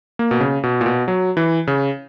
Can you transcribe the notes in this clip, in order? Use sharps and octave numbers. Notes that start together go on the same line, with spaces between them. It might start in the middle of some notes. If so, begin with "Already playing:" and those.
A#3
B2
C#3
B2
A#2
B2
F#3
E3
C#3